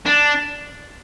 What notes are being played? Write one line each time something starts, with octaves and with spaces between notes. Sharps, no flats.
D4